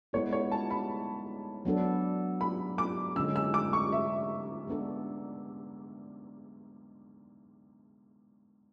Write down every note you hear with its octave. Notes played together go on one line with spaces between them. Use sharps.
G#3 B3 E4 C#5
C#5
A5
B5
F#3 B3 D4 A4
B5
D6
D3 G#3 C#4 E6
E6
D6
C#6
E5
G#3 B3 D4 A4